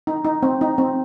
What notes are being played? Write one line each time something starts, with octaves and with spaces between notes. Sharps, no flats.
D#4
D#4
C4
D#4
C4